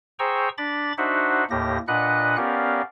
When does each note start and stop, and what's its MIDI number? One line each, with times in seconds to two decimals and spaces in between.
0.19 0.49 68
0.19 0.49 72
0.19 0.49 79
0.19 0.49 82
0.19 0.49 85
0.19 0.49 88
0.58 0.93 62
0.58 0.93 83
0.58 0.93 86
0.58 0.93 93
0.98 1.44 62
0.98 1.44 63
0.98 1.44 66
0.98 1.44 72
0.98 1.44 76
0.98 1.44 78
1.50 1.78 39
1.50 1.78 45
1.50 1.78 58
1.50 1.78 67
1.50 1.78 94
1.88 2.36 46
1.88 2.36 62
1.88 2.36 71
1.88 2.36 75
1.88 2.36 78
1.88 2.36 90
2.37 2.82 59
2.37 2.82 61
2.37 2.82 67
2.37 2.82 70
2.37 2.82 74
2.37 2.82 77